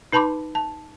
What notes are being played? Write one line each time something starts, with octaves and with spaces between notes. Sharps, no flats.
D#4 B4 A5 B5 C6 D6
A5